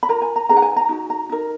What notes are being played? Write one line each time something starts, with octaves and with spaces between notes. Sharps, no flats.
B5
F4 A#4 A#5
G#5
A#5
D#4 G#4 B4 A#5
F#5
G#5
A#5
D#4 F#4
A#5
D#4 A#4